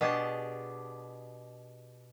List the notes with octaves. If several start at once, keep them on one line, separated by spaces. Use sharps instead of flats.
B2 D4 G4 G#4 A5